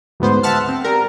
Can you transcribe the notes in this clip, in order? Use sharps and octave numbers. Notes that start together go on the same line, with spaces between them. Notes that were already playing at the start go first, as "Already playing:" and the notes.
D2 G#2 B3 C5
E5 F#5 A5 F6
C4
G3 A#4